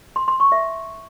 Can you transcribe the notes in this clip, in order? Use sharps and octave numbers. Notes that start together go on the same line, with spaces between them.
C6
C6
C#6
E5